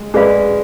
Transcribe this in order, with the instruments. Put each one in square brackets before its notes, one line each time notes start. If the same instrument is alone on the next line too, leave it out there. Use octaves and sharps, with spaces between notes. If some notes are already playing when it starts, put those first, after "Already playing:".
Already playing: [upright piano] G#3
[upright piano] G#3 [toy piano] G#4 B4 D5 F5 B5